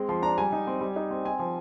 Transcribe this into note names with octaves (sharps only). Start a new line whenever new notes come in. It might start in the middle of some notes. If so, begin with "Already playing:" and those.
Already playing: G#3 C4
F3 C6
D4 A#5
G3 G#5
D#4
C4
G3
D#4
C4
C4 G#5
F3